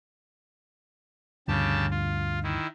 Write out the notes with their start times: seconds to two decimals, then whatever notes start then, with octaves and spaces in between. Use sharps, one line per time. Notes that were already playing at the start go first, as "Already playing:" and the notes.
1.48 D2 G2 C#3 G4 A5
1.91 F4
2.43 D#3 E4